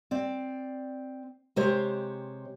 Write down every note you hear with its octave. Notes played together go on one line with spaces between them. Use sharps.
C4 D5
C3 G#3 G4 C5 C#5